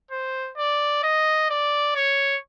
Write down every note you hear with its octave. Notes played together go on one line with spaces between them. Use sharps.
C5
D5
D#5
D5
C#5